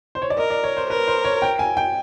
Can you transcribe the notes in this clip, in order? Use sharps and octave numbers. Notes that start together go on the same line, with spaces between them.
C5
C#5
D5
A#4 D#5
D5
C#5
C5
A#4 B4
C5
C#5
G5
G#5
G5